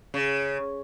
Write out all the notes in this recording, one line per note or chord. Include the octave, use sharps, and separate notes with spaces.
C#3